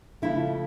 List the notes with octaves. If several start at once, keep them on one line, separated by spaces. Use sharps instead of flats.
C#3 F3 A3 E4